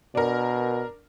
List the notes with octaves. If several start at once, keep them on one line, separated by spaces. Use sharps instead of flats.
B2 D4 A#4